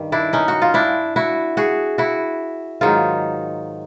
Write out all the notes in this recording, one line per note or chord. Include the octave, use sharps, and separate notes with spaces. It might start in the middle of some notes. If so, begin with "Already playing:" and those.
Already playing: G2 D#3 G3
D4 E4
C#4 D#4
F#4
F4
D4 E4
E4 F#4
F#4 G#4
E4 F#4
G#2 D#3 F#3 D#4 F4